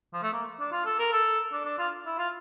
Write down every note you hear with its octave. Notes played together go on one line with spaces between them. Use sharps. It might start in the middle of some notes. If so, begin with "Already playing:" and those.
F3
A3
A#3
D4
F4
A4
A#4
A4
D4
D4
F4
E4
F4